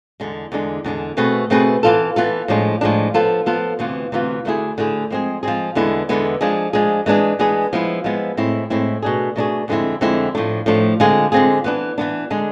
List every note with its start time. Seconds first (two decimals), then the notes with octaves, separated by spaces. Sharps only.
0.20 E2 D3 G#3
0.52 E2 D3 G#3 D4
0.84 E2 D3 G#3 D4
1.17 B2 A3 C4 G#4 B4
1.50 B2 A3 C4 G#4 B4
1.83 E3 B3 F4 A4
2.16 E3 B3 F4 A4
2.48 A2 F3 G#3 D4
2.81 A2 F3 G#3 D4
3.14 F3 B3 F4 A4
3.46 F3 B3 F4 A4
3.79 D2 C3 E3 B3 F4
4.12 D2 C3 E3 B3 F4
4.45 D2 D3 A3 E4 G#4
4.78 D2 D3 A3 E4 G#4
5.11 F3 G#3 C4 G#4
5.43 F3 G#3 C4 G#4
5.75 E2 D3 G#3 B3 E4
6.09 E2 D3 G#3 B3 E4
6.41 F3 G#3 D4 G#4
6.73 F3 G#3 D4 G#4
7.06 E3 G#3 B3 D4 G#4
7.39 E3 G#3 B3 D4 G#4
7.73 F3 G#3 B3 E4
8.04 F3 G#3 B3 E4
8.37 A2 G#3 C4 E4
8.70 A2 G#3 C4 E4
9.03 B2 A3 D4 G#4
9.36 B2 A3 D4 G#4
9.68 F2 D3 G#3 C4 E4
10.01 F2 D3 G#3 C4 E4
10.35 A2 F3 A3 D4
10.66 A2 F3 A3 D4
11.00 D3 G#3 C4 F4 G#4
11.32 D3 G#3 C4 F4 G#4
11.64 E3 B3 D4
11.98 E3 B3 D4
12.30 D3 G#3 D4 G#4